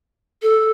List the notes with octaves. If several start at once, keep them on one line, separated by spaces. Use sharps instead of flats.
A4